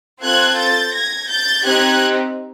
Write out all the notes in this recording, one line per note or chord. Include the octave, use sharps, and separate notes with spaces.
C4 F4 A4 F#6 G#6
G6 A6
G#6 A#6
G6 A6
C4 D#4 G4 F#6 G#6